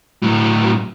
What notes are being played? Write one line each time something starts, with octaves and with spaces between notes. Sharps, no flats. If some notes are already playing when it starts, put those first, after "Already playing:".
A2 F#3